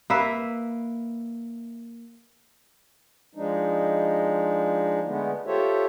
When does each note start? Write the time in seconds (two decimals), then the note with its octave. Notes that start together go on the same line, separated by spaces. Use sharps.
0.10 A#3 B4 E5
3.35 F3 G#3 D4 D#4
5.04 D3 G#3 A3 B3
5.46 F4 G4 A4 C5 C#5 E5